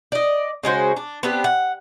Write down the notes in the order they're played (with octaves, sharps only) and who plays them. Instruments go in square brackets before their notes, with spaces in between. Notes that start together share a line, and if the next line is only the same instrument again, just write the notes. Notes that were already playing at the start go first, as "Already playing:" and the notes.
[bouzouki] D5 D#5
C#3 G#3 F#4 C5
D4
B3 C4 D4 G4
F#5